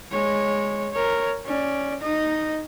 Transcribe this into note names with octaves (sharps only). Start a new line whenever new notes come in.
G#3 C#5
A#4 C#5
C#4 D5
D#4 D#5